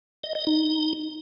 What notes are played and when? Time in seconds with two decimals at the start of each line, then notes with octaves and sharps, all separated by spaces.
0.24 D#5
0.35 D#5
0.47 D#4